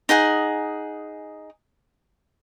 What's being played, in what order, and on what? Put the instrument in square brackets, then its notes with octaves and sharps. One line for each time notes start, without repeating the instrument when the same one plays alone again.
[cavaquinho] D#4 G#4 F#5 G#5